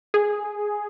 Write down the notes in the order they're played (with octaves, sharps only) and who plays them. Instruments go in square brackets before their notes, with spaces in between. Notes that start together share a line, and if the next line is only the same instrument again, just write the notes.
[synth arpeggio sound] G#4